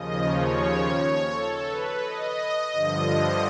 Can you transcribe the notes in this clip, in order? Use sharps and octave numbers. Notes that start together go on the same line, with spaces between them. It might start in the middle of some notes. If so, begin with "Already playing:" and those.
Already playing: D#2 C#3 F3 D#5
C#5
A4
B4
D#5
G2 D3 F3